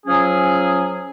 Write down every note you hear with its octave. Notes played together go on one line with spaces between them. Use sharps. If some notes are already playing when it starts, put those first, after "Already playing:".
F3 F#3 C#4 G#4